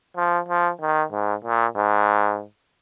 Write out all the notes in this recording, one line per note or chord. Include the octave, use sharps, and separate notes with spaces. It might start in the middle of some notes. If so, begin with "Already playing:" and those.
F3
F3
D#3
G#2
A#2
G#2